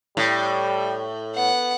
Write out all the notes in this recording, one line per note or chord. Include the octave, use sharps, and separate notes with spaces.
A2 G3
B3 F#5